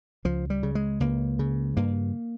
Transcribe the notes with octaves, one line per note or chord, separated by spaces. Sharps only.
C#2 F3
G3
C#3
G#3
C#2 A#3
C#3
G2 A#3